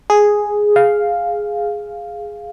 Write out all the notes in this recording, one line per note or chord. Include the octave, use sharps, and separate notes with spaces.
G#4
F5